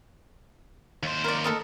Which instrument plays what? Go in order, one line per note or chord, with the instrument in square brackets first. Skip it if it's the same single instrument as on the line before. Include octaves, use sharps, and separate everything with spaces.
[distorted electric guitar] D#2 C5
[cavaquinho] A#4 D5
A4 A#4 D#5